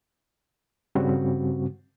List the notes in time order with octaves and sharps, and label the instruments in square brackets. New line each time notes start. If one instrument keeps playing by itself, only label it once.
[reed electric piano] G2 C#3 G3 C4 F#4